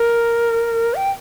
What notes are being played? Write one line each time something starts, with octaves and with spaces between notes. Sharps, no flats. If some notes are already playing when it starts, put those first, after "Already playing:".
Already playing: A#4
G5